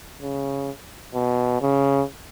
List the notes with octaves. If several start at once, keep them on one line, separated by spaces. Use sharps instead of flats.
C#3
B2
C#3